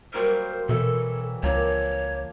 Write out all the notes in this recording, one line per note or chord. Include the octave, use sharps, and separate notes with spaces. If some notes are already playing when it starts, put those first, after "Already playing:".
F#3 G3 A#3 A#4 C5
B2 E3 A4 A#4 C#5 E5
C#2 F3 A#3 D4 C#5